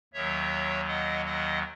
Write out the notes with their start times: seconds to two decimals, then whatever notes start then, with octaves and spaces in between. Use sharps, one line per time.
0.13 D#2 D#3 F#3 C#5 E5
0.88 D#5 F#5
1.26 D#5 F#5